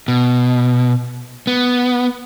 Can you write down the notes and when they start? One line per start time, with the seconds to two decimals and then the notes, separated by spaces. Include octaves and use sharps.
0.08 B2
1.47 B3